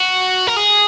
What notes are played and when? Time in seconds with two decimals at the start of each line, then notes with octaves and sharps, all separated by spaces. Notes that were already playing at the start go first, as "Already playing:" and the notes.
Already playing: F#4
0.47 A#4
0.56 G#4